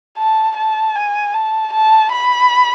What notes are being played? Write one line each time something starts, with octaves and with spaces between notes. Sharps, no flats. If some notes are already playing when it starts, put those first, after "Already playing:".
A5
A5
G#5
A5
A5
B5